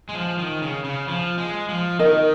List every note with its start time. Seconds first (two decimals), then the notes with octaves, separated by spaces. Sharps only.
0.09 G#3
0.15 F3
0.38 D#3
0.62 C#3
0.84 C#3
1.07 F3
1.38 G#3
1.68 F3
1.99 D#3 A#4 D#5